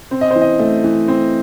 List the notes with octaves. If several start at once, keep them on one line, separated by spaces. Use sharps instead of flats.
C4
D#5
C5
E3
D#5
A3
E3
C4